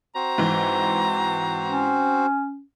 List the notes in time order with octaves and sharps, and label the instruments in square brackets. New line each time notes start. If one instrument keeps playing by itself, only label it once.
[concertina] C4 F#4 C5 [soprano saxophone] A#5
[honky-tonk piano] G#2 E3
[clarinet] C#4